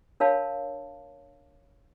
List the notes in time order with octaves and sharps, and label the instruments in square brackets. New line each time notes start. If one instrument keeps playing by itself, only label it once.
[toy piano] D4 A#4 C#5 F5 A5 B5